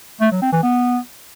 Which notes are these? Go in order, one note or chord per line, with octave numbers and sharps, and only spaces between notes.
A3
F#3
C4
E3
B3